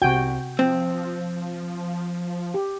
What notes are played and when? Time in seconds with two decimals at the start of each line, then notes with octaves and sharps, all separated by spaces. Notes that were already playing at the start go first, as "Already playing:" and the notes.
0.02 C2 C3 F#4 G5 G#5 G6
0.59 F3 C4
2.54 G4